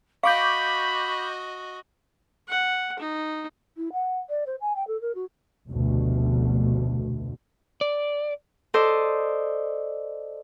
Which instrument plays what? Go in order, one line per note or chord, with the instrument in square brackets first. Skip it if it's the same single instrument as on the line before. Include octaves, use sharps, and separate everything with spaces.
[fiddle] F#4 D#5 [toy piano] F5 [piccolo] B5 [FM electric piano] C#6 D6 G6
[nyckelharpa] F#5
D#4
[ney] E4
F#5
D5
C5
G#5
G5
A4
A#4
F#4
[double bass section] F1 D2 B2
[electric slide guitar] D5
[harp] A4 C5 D5 D#5